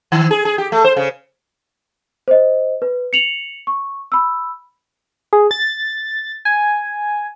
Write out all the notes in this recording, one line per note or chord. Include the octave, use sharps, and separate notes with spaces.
D#3
G#4
G#4
G4
A3
C5
C#3
C5 D#5
B4
C#7 F7 F#7
C#6
B5 E6
G#4
A6
G#5